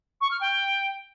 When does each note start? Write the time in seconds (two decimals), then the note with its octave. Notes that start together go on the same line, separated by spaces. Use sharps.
0.21 C#6
0.31 F6
0.41 G5